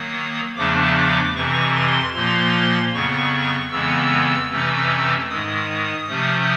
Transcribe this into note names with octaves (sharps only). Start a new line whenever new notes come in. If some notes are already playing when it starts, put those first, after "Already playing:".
Already playing: D#3 F#3 A#3 D#6
E2 C#3 F3 A3 D4 D6
D6
F2 C3 E3 C#6
C6
A#2 F3 A#3 C6
F2 C#3 F#3 B3 C#6
F2 C#3 E3 G#3 B3 E6
F2 C3 E3 A3 C#4
G#2 D#3 G#3 D#6
C3 F3 A3 C#4